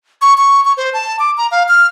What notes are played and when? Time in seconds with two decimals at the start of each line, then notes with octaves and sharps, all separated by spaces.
0.22 C#6
0.38 C#6
0.65 C#6
0.77 C5
0.94 A5
1.19 D6
1.38 A#5
1.51 F5
1.69 F6